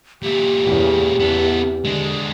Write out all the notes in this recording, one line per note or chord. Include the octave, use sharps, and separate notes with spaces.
A#2 E4 G4
E2 C#3
E2 B3 A4
D3 G#3 D4